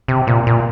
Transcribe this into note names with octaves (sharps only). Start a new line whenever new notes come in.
C3
A#2
A#2